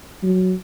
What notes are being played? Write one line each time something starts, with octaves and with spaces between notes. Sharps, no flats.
F#3